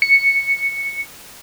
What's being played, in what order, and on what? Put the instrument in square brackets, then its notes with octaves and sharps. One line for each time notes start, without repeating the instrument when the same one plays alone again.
[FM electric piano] C#7